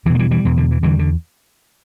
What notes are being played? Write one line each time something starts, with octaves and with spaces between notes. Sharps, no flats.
E2 B2 E3
A#3
E3 G3
E3 G3
E2 B2 E3
D3
E3
E2 D3 E3 G3
D3